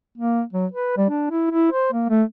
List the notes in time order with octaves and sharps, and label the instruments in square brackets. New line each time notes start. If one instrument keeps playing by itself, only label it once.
[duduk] A#3
F#3
B4
G3
D4
E4
E4
C5
A#3
A3